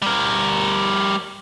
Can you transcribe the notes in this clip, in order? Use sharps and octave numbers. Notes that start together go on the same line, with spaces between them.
G3 A#4